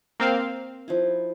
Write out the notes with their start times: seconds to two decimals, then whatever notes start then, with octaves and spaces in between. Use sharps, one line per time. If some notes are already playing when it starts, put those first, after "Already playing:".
0.20 A#3 C4 F5
0.88 F3 D#4 E4